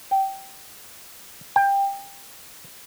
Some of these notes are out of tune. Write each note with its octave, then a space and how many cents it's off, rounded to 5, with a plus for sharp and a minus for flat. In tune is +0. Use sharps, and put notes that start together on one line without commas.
G5 -15
G5 +20